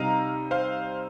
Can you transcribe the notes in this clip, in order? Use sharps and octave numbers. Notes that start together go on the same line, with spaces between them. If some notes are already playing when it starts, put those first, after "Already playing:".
Already playing: C3 G3 D#4 F5 A#5
C5 F5